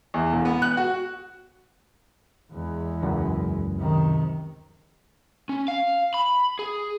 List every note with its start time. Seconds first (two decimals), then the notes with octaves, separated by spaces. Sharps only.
0.14 E2
0.33 E1
0.45 B3
0.62 F#6
0.77 F#4
2.53 E2 G#3
3.02 C#2 F#2
3.76 C3 D#3
5.49 C#4
5.68 F5
6.14 B5
6.59 G#4